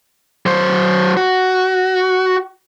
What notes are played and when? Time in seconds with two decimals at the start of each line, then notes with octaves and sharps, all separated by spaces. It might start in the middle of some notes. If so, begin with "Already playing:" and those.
0.46 F#3 C5
1.17 F#4